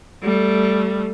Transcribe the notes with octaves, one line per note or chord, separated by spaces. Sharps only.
G3 A3